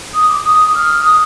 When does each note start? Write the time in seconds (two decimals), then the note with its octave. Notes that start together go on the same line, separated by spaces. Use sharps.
0.14 D#6
0.28 D6
0.44 D#6
0.74 F6
1.04 D#6